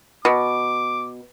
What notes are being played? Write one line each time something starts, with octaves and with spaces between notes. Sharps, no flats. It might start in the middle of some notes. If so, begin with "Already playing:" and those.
B2 D6